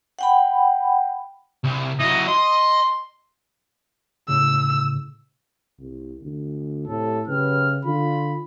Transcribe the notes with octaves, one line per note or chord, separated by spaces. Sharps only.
F#5 G5 B5
C2
E3 F#3 D#5
D#5 C6
A2 C#3 E6
C2
D2
A2 C3 A4
F#2 C#3 G4 B4 F6
D3 F4 B5